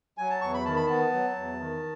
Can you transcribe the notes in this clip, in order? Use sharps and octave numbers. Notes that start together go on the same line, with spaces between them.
F#3 G#5
A5
E2 C#6
B5
D#3 A5
B5
B3 A5
F#3
E2
D#3